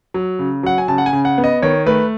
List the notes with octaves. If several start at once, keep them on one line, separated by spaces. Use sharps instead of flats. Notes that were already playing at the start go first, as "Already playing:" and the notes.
F#3
C#3
F#3 F#5
G#5
C#3 A5
F#5
G#5
C#3
F#5
B3
D#5
D#3 C#5
A3 B4